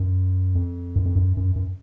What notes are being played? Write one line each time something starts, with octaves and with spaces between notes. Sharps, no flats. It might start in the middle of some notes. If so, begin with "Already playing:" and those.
Already playing: F#2
F2
F#2
F2
F#2
F#2
F#2